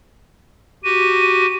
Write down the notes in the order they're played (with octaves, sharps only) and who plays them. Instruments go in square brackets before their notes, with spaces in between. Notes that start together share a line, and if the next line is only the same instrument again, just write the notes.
[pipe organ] F#4 G4 [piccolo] D#7